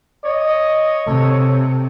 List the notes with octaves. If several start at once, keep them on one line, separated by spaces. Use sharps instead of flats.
C#5 D#5
C3 A4